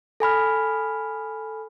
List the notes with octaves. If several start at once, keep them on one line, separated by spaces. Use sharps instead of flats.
A4 G#5 B5 F6